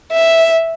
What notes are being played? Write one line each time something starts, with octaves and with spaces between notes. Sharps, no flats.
E5